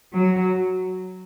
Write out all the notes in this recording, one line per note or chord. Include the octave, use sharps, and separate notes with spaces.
F#3